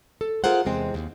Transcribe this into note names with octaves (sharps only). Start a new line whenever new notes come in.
A4
F4 G#4 A#4 C5 F#5
E2 C3 G#3 C4
D#2